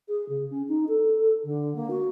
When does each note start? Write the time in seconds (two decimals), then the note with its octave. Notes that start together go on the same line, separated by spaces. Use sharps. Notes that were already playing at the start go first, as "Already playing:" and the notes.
0.08 G#4
0.29 C#3
0.50 C#4
0.68 D#4
0.88 A4
1.44 D3
1.75 A#3
1.90 F#4